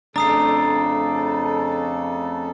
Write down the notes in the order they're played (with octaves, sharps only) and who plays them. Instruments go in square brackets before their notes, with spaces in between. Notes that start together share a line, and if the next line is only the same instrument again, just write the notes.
[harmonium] F2 C#3 A4 [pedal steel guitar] A3 D4 [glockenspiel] A#5 D#6 C7